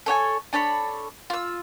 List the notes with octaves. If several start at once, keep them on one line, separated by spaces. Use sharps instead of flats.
A4 C#5 G5 G#5
D4 A4 C#5 B5
F4 E6